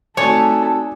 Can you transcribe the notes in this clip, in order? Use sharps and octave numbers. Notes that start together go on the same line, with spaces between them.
A3 C4 D#4 F#4 A4 C#5 D5 G#5